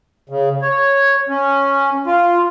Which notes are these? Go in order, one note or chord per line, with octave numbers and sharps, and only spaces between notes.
C#3
C#5
C#4
F4